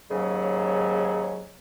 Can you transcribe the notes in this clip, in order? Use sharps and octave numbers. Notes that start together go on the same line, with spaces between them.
D#2 G#2 C#3 F#3